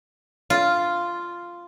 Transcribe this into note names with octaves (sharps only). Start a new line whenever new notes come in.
F4